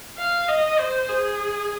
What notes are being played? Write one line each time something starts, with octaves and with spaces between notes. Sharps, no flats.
F5
D#5
C5
G#4